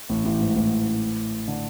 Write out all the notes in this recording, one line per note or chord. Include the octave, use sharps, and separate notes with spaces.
A1 A2
A1 A2
G#2
A1 A2
D3